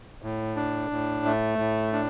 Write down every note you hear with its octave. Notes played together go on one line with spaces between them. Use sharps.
A2
D4
A2
A3
A2
D4